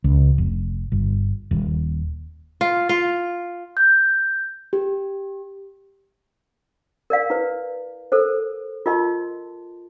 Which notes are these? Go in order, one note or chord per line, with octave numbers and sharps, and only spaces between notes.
C#2
F1
G1
D#1
F4
F4
G6
G4
A#4 D5 F5
E4 B4
A4 A#4 C5
F4 A#4 D#5 A5 C6